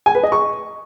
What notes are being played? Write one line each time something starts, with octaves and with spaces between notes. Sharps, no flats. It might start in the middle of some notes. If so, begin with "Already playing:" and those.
G#5
B4
D#5
C#6